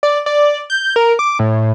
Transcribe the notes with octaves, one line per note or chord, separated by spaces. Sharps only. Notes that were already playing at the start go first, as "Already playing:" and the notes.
D5
D5
G6
A#4
D6
A2